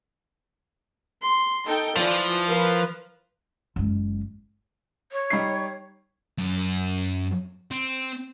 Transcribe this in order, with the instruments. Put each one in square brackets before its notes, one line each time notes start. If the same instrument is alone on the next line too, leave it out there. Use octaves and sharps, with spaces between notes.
[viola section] C6
D#4 A4 G5
[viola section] E3 F4 D5 [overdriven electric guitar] F3
[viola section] A#4 B4 F5
[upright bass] F#1 G#3
[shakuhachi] C#5
[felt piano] G3 D#4 C7
[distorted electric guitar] F#2
C4